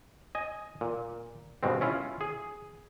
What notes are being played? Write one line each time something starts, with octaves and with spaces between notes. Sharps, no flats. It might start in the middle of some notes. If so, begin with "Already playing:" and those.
D#5 G#5
A#2
G2 B2 G#3 C4
C#4 E4 F4
G#4